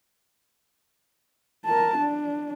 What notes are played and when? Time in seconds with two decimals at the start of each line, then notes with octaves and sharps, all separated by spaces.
1.65 A#4 A5
1.97 D4